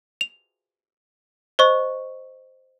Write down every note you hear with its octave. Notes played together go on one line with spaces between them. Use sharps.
F7
C5 D#5 C#6